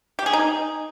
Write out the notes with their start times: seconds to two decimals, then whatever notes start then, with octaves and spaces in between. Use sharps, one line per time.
0.19 G4
0.26 G#4
0.33 D#4